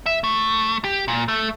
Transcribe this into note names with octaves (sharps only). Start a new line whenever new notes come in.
E5
A3
G4
A#2
A3